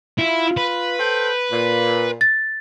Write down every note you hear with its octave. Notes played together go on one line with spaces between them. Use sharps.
E4 F4
B4
A4 C5 G5
A#2
A6